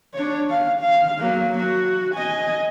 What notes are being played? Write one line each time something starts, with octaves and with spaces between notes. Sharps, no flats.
D4 C#5
F5
F5
F#3 A#3
F#4
D#5 G#5